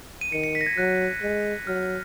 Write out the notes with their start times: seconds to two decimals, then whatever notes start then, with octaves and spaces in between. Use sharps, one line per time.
0.21 D#7
0.32 D#3 C#7
0.44 C#7
0.55 B6
0.61 A#6
0.66 G#6
0.77 F#3 F#6
1.22 G#3
1.67 F#3 F6